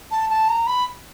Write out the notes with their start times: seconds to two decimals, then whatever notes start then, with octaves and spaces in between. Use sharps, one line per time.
0.11 A5
0.30 A5
0.49 A#5
0.67 B5